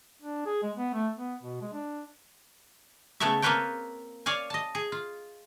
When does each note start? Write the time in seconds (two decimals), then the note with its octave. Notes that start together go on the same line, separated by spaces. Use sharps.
0.22 D4
0.46 G#4
0.63 G#3
0.77 B3
0.94 A3
1.17 B3
1.43 B2
1.61 G#3
1.73 D4
3.20 C#3 A3 B3 A4 C#5 E5
3.42 A#3 C4 F4 B4 C#5 G5
4.26 C#5 D5 F5 G#5
4.50 D#5 A5
4.75 G#4
4.92 F4